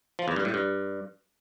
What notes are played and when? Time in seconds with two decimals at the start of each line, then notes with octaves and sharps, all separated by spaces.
0.19 F3
0.28 E2
0.36 G2
0.45 A2
0.54 G2